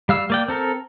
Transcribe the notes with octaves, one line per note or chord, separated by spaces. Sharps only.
G3 F5 E6
A#3 D5 G5
C4 A4 A#4